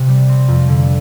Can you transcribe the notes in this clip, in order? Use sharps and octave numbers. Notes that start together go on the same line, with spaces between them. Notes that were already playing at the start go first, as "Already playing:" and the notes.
Already playing: C3
G3
C4
F2
D3